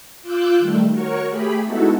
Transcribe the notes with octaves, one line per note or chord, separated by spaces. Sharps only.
F4 D6 E6 F#6 G6
D#3 G3 A3
F#4 A#4 C#5 C#6
A3 G4 G#4 B5
G#3 B3 D#4 E4 F#4 A4